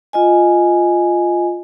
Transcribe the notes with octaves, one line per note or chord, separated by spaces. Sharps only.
F4 D#5 G#5